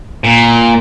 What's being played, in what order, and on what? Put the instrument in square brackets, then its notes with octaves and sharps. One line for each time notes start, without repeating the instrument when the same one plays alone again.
[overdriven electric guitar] A#2